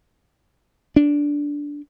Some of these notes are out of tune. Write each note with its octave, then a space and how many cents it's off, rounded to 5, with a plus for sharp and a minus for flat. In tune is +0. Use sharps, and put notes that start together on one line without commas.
D4 -10